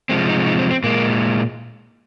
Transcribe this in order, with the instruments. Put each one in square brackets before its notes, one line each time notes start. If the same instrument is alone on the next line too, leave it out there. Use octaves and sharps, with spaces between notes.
[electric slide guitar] C3 F3 G#3 C4
D#4
D#4
C4
C4
A#2 G#3 A#3